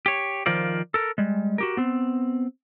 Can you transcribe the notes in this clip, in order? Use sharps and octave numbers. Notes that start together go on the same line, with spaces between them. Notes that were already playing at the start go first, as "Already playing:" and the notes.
G4 C#5
D#3 F3 F4 A#4 C5 D5
A4 A#4
G3 G#3
F#4 G4 A#4
B3 C4